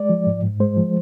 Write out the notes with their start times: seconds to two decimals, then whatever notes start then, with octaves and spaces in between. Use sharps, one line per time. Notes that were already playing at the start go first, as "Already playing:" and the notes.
Already playing: G#3 D5
0.10 F3
0.27 G#2
0.43 G#2
0.60 G#3 C5
0.77 F3